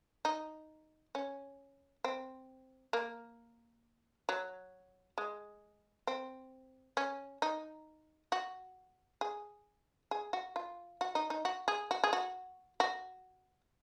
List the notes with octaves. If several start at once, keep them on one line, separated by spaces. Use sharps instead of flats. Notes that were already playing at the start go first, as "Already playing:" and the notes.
D#4
C#4
C4
A#3
F#3
G#3
C4
C#4
D#4
F#4
G#4
G#4
F#4
F4
F#4
D#4
D#4
F#4
G#4
F#4
G#4
F#4
F#4